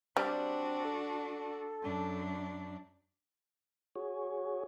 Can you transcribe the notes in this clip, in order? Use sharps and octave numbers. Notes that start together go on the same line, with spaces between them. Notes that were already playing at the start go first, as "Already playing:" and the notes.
G3 C4 D4 F#4
A4
F#2 D4
F#4 G#4 C#5